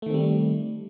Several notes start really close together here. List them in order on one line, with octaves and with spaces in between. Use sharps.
A3 D#3 C4 G3